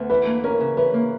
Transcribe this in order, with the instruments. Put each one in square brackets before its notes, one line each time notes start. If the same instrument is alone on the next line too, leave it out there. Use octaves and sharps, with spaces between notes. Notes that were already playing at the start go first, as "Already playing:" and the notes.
Already playing: [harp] D2 B3
[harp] E3 [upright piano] B4
[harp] A#3
[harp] C#4 [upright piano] A#4
[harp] C#3
[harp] E3 [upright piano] B4
[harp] A#3